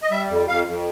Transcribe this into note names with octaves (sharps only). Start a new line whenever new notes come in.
D#5
G3 E5
F2
F2 F5
F2